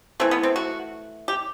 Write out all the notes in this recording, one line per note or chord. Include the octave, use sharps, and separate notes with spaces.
E3 A3 C4
B3
C4
F#4
G4